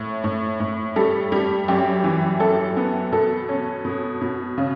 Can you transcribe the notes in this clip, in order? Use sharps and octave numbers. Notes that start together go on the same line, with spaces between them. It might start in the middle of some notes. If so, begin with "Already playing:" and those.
Already playing: A2
A2
A2
G3 A4
G3
F#2 G4
E3
F#2 A4
B3
B2 A4
C#4
B2
B2
C#3